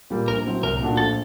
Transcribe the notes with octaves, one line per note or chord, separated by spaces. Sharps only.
A#2 G3 A#3
A#1 A#4
A2 F#3 C4
C2 A#4
A#2 A3 D4 F#4
A#1 A4